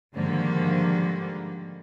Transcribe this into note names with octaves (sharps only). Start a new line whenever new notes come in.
G#2 D3 D#3 F3 G3 A#3